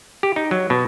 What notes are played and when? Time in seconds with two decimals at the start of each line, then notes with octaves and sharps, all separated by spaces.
0.23 G4
0.36 D#4
0.51 F#3
0.70 B2